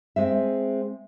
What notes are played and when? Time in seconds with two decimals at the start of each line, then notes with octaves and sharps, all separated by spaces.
0.16 G#3 C4 E5